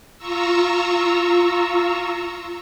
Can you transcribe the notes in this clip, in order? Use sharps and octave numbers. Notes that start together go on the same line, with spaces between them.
F4 A#5 C#6 E6